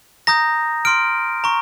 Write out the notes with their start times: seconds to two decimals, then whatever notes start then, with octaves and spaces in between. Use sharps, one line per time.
0.27 A#5 D#6 G6 A#6
0.85 C6 F6 D7
1.44 A#5 C#6